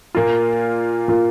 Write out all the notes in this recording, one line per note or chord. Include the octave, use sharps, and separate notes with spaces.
A#2 A#3 F4
A#2 A#3 F4